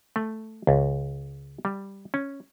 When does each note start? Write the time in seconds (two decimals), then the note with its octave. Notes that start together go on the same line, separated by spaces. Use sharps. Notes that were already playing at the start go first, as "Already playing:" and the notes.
0.16 A3
0.67 C#2
1.65 G3
2.14 C#4